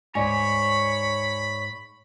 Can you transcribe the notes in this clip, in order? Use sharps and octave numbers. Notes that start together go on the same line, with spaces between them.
D2 G#2 C#5 D5 G#5 B5